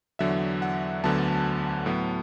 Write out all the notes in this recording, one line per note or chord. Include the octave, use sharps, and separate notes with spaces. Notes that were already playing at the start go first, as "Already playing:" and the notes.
E2 D3 F#3 E5
F#5
D2 D3 F#3 B3 A5
A2 F#3 B3